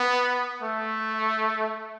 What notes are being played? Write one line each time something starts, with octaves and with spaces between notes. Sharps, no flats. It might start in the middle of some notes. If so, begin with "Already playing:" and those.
Already playing: B3
A3